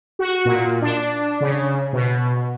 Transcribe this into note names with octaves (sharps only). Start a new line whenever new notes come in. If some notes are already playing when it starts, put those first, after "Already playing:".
F#4
A#2
D4
C#3
B2